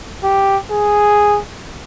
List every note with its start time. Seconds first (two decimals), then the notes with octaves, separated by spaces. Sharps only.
0.24 G4
0.72 G#4